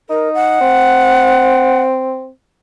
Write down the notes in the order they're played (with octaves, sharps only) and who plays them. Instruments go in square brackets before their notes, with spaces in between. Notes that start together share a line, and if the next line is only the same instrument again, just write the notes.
[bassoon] D#4 [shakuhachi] A#4
[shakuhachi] F#5
[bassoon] C4